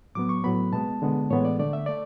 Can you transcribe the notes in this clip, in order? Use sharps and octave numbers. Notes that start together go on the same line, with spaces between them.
A2 F#3 B3 D6
C#6
A2 F#3 B3 B5
B2 G#3 B3 A5
D3 G#3 B3
A2 E3 G#3 B3 C#5
D5
D3 A3 D5
E5
A3 D5